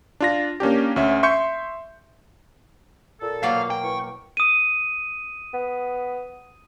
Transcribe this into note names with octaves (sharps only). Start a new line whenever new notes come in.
D4 F4 A#6
A#3 C#4 D4 G4
D2 C#4 E5
E5 C6 C#6 G6 C#7
A#2 A4
B2 F#3 A#3 F5
G5
E3 C#6
D#6 D#7
B3